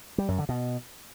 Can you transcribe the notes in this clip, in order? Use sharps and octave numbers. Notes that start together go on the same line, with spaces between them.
G3
F#2
D3
B2